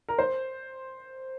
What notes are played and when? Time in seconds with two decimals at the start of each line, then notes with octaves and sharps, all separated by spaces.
0.08 A#4
0.19 C5